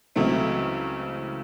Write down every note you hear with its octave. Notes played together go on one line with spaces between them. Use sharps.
C#2 C#3 E3 F#3 A3 C4